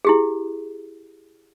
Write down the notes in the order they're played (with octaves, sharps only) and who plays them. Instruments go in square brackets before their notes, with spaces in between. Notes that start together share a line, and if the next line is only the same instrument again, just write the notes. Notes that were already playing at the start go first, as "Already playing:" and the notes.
[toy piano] E4 G4 G#4